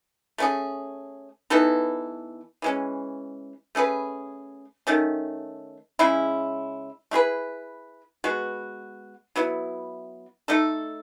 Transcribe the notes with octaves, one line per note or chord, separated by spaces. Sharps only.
A3 C#4 G#4
E3 B3 D#4 A4
E3 G#3 C#4
A3 C#4 G#4 B4
D#3 A3 C#4
C#3 G#3 C#4 E4
A3 E4 G#4 B4
G#3 B3 F#4
F#3 B3 E4
A3 D#4 A4